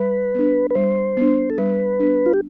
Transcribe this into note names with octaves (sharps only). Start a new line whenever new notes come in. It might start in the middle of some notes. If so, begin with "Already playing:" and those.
Already playing: G3 B4
B3 D4
B4
G3 C5
B3 D4
A4
G3 B4
B3 D4
F4
G4